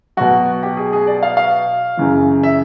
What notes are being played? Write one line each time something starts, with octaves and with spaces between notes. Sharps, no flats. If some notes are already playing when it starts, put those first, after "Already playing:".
B2 F#3 F#4
G4
G#4
G#4
D5
F5
F5
F#2 C#3 E3
E5